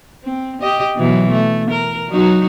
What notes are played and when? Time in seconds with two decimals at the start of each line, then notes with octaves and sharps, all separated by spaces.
0.24 C4
0.62 G4 D#5
0.96 B2 E3 F#3
1.31 A3
1.71 A#4
2.09 F#3 D#4 F#4